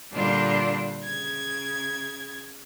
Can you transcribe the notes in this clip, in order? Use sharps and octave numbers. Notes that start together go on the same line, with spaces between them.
A#2 D3 G3 D4 F4
C#3 G#6